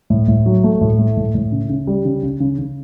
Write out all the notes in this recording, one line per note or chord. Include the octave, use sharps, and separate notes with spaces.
A2
A2
F#3
A3
A2
A3
A2
A2
C#3
C#3
G3
C#3
C#3
C#3
C#3